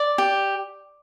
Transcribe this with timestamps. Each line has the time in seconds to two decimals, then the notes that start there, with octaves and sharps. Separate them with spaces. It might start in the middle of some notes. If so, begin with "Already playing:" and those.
Already playing: D5
0.18 G4